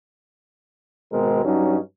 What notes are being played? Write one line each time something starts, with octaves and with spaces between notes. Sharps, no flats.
G#1 B2 G#3 C4 A#4
G2 F#3 C#4 D#4